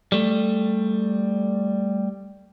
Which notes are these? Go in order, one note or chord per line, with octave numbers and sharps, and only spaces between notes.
G3 A3